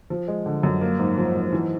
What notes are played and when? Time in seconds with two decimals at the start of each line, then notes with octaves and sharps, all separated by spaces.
0.10 F3
0.28 G#3
0.46 D3
0.63 F#2
0.81 A#3
0.99 G#2
1.17 F3
1.34 G#2
1.53 E3